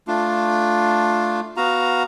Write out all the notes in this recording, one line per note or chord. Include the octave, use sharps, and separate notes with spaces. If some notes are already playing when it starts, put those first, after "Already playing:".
A3 D4 F4
B3 F#4 F5 A#5